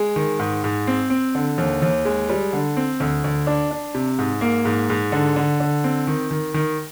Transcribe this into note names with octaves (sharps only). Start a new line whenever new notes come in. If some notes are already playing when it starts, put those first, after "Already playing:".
Already playing: G#3
D#3
G#2
G#2
C4
C4
D3
D#2
D#2
G#3
G3
D3
C4
D2
D2
D4
D4
C3
G#2
A#3
G#2
G#2
D3
D3
D3
C4
D#3
D#3
D#3